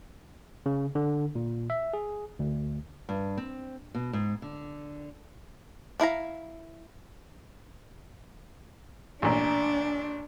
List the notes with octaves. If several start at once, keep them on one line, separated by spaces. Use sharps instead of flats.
C#3
D3
A#2
E5
G#4
D2
G2
C4
B2
G#2
D3
D4 E4 F5 A#5
A1 A#2 D4